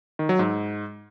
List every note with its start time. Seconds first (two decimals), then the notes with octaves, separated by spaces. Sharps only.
0.19 D#3
0.29 F#3
0.39 G#2